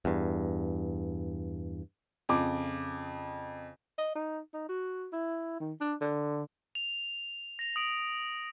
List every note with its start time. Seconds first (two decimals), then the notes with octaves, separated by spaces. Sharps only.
0.05 E2 G2
2.29 F2 C#3 D6
3.98 D#5
4.15 D#4
4.54 D#4
4.68 F#4
5.13 E4
5.60 D#3
5.81 D4
6.01 D3
6.75 F7
7.59 A#6 F7
7.76 D#6 D7